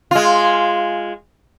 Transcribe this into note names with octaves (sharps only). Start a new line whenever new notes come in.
G#3 F4